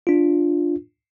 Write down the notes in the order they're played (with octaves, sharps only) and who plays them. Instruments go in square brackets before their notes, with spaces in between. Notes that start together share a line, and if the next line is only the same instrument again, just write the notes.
[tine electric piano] D4 F4